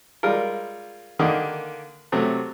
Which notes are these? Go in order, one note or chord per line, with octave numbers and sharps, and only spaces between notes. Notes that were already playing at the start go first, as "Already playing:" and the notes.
G3 G#3 F4 A#4
D3 D#3 A#3
C3 F#3 A3